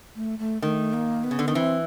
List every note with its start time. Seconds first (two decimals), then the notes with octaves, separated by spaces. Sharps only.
0.16 A3
0.39 A3
0.62 D#3 A3
0.93 A#3
1.24 B3
1.31 C#3
1.39 D3
1.48 D#3
1.55 E3 C4